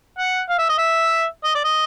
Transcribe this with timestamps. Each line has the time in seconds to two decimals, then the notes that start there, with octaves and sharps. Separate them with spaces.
0.19 F#5
0.50 F5
0.59 E5
0.69 D#5
0.78 E5
1.45 D#5
1.55 D5
1.65 D#5